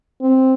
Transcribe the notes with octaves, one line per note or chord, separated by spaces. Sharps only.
C4